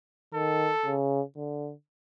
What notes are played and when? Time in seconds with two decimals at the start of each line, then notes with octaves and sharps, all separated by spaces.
0.34 D#3 A4
0.86 C#3
1.36 D3